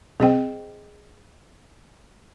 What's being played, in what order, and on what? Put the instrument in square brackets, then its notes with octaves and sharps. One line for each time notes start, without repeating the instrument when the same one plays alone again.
[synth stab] C2 C4 [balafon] G#4 D#5 G5